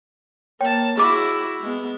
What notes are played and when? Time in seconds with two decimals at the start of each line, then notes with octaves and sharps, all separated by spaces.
0.61 A#3 C#5 G5 A5
0.97 E4 F#4 G#4 D6
1.62 G#3 B3